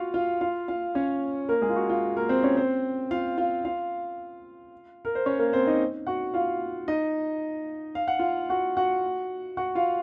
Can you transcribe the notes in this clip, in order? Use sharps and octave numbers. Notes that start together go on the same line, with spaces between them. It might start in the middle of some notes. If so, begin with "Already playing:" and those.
Already playing: F4 F#4 F5
F4 F5
F4 F5
F4 F5
C#4 C#5
A#3 A#4
G#3 G#4
F4
F#4
F4
A#3 A#4
C4 C5
C#4 C#5
C4 C5
F4 F5
F4 F5
F4 F5
A#4
C5
C#4 C#5
A#3 A#4
C4 C5
D#4 D#5
F#4 F#5
F4 F5
D#4 D#5
F5
F#5
F4 F5
F#4 F#5
F#4 F#5
F#4 F#5
F4 F5